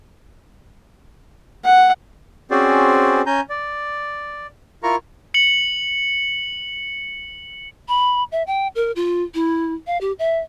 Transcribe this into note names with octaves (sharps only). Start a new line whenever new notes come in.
F#5
C4 C#4 F#4 G#4 C5 D5
C#4 G#5 A#5 G6
D5
E4 F4 A#4 A#5 C#6 F6
C#7 F#7
B5
E5
G5
A#4
F4
E4
F5
G4
E5